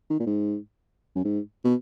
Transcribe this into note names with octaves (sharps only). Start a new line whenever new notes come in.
D#3
A#2
G#2
F#2
G#2
B2